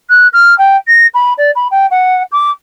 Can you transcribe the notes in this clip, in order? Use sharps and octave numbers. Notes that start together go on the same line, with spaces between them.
F#6
F6
G5
A#6
B5
D5
B5
G5
F#5
D6